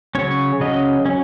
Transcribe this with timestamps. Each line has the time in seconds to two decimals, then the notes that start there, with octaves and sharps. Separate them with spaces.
0.15 C#3 F#3 C#4 C#5
0.60 C#3 F#3 C#4 D#5
1.06 F#3 C#4